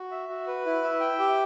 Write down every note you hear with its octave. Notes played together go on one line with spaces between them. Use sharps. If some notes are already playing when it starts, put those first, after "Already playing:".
Already playing: F#4
E5
F#4
B4
E4
E5
G5
G4